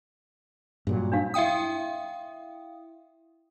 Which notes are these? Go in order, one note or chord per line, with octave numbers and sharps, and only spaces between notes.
G2 A#2 F#3
D4 D#4 F5
E4 E5 F5 G5 D#6